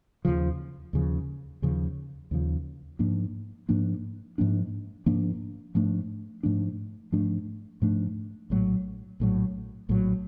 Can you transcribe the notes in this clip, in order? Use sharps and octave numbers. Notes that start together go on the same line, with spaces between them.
D#2 C#3 F3
D#2 C#3 F3
D#2 C#3 F3
D#2 C#3 F3
G#2 F3 A#3 D4
G#2 F3 A#3 D4
G#2 F3 A#3 D4
G#2 F3 A#3 D4
G#2 F3 A3 D4
G#2 F3 A3 D4
G#2 F3 A3 D4
G#2 F3 A3 D4
A#1 A2 F#3
A#1 A2 F#3
A#1 A2 F#3